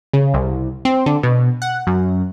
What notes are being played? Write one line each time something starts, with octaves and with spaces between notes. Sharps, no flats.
C#3
C2
C4
D3
B2
F#5
F#2